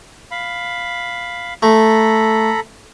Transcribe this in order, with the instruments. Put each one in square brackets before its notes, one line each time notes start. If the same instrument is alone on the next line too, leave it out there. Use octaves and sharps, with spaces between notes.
[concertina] F5 B5
[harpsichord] A3 [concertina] A4 A#5 B5